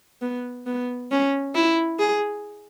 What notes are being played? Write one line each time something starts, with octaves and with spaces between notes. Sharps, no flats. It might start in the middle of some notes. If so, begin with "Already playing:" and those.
B3
B3
C#4
E4
G#4